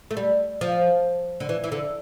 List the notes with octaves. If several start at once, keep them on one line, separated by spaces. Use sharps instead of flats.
A3
G3
F3
D3
E3
E3
D3